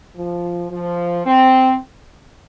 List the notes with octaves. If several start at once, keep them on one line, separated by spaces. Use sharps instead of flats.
F3
F3
C4